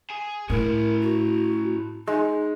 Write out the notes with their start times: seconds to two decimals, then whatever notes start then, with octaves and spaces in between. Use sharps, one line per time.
0.10 G#4 G#5
0.50 A2 C#4 E4 A#4
1.02 F#4
2.07 G#3 D#4